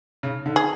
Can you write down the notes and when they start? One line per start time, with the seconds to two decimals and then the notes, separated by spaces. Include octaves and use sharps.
0.23 C#3
0.46 D3
0.56 G#4